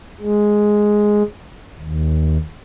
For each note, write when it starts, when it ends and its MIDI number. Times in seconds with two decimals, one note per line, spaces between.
0.21 1.23 56
1.79 2.37 39